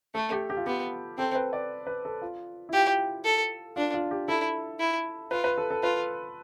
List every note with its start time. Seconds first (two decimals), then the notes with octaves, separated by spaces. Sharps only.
0.15 A3 A4
0.32 G4
0.50 G4
0.57 F4
0.66 B3 G4
1.18 C4 A4
1.31 C5
1.35 B4
1.53 D5
1.87 B4
2.05 A4
2.22 F4
2.69 E4
2.73 F4 G4
3.24 A4
3.76 D4 F4
3.94 F4
4.11 G4
4.28 E4 A4
4.80 E4
5.31 F4 B4
5.44 B4
5.58 A4
5.71 A4
5.83 F4 B4